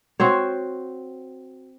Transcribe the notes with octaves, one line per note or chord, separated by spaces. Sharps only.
C4 F#4 C5 C#5